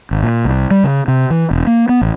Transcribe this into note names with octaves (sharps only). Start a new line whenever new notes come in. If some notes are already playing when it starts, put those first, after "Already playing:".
G#1
A#2
C2
G3
C#3
C3
E3
E1
A#3
B3
A1